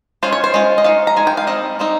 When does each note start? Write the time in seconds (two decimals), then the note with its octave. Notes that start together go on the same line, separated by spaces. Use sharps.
0.23 G#3 C#4 F4 C5
0.33 C#5
0.44 C5
0.54 G#3 C#4 F4
0.78 D#5
0.84 G#3 D#4 F5
1.07 A#5
1.16 G#3 D#4 G#5
1.27 G5
1.37 F5
1.47 G3 C4 D#4 D#5
1.79 G3 C4 D#4